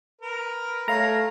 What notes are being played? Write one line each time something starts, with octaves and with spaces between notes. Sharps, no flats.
A#4 B4
A3 C#5 F5 A#5